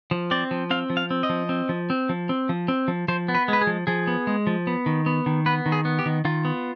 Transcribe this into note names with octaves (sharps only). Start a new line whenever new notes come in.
F3
C4 D5
F3
C4 F5
F3
F5
C4
D#5
F3
C4
F3
C4
F3
C4
F3
C4
F3
F3 C5
B3
B4
G#3 B4
G#4
F3
F3 G#4
B3
G#3
F3
B3
D#3
B3
D#3
B3 B4
D#3
G#4
B3
G4
D#3
D#3 F4
B3